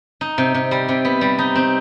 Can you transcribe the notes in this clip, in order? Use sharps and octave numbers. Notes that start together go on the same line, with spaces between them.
D#4
C3
C3
G3
C3
B3
G3
D#4
C4